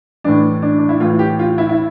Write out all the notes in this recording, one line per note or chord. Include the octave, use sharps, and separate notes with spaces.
A2 E3 D4
D4
D4
E4
A2 E3 F4
G4
F4
E4
E4